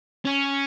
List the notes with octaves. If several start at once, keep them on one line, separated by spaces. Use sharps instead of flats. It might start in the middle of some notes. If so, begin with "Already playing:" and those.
C#4